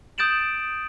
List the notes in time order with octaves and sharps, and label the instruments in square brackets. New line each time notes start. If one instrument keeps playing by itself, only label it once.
[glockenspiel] D#6 G6 A6 D7 E7 F#7